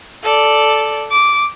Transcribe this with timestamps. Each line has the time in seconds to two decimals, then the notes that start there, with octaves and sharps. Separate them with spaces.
0.23 A4 D5
1.11 D6